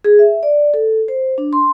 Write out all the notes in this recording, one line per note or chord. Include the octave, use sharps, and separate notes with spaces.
G#4
E5
D5
A4
C5
D4
C6